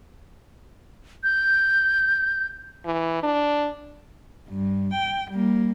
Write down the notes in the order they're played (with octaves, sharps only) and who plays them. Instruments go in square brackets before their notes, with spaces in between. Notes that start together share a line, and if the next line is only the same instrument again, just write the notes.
[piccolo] G6
[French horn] E3
D4
[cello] G2
G5
G3 A#3